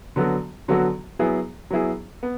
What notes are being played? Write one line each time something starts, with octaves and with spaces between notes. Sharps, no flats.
D3 F#3 B3 F#4 A4
D3 F#3 B3 F#4 A4
F#3 B3 E4 G#4
F#3 B3 E4 G#4
B3